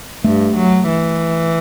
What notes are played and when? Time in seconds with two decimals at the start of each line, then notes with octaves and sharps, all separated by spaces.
0.24 G2 A3
0.56 F#3
0.89 E3